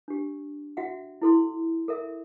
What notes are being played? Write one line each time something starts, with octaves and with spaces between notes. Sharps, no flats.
D4 G4
F#4 E5 F#5 G5
E4 A4 C6
A4 A#4 E5